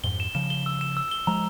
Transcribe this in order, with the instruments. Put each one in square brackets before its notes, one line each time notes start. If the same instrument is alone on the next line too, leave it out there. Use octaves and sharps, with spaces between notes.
[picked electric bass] F2 G#2 [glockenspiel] G7
[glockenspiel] E7
[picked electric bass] C#3 F3 [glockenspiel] E7
[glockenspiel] G7
E6
E7
E6
G7
[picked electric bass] F3 G#3 [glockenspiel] A#5